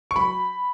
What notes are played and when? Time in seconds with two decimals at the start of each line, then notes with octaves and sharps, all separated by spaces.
0.11 C#6
0.16 F#3 B5